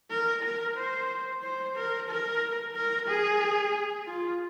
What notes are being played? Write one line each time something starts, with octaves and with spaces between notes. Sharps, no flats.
A#4
A#4
C5
C5
A#4
A#4
A#4
G#4
F4